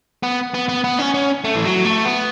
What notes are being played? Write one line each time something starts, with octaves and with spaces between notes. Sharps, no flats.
B3
B3
B3
B3
C#4
C#4
A3
E3
F#3
A3
B3